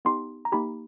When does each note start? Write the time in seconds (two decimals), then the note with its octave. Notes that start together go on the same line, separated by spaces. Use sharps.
0.05 B3 D#4 G4 C6
0.45 A#5
0.52 A#3 D#4 G4 B5